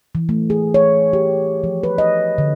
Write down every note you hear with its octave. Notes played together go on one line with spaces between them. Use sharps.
E3
A3
G#4
C#5
G4
F3
B4
D#5
D3